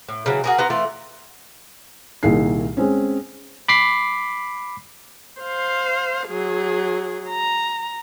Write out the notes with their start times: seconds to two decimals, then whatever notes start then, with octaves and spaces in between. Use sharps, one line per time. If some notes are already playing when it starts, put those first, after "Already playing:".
0.09 A2
0.26 C#3 E3 F#3
0.44 F#4 G#4 A#4
0.59 B3 F4 A#5
0.70 E3 A3 F4
2.23 C2 A#2 D#3 G#4 C7
2.77 G#3 C4 C#4
3.68 B5 D6 B6 C7
5.42 C5 F5
6.28 F#3 G#4
7.29 A#5